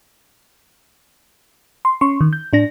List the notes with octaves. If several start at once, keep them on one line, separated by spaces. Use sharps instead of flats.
C6
C#4 C6 C#6
D#3
G6
A2 D4 A#6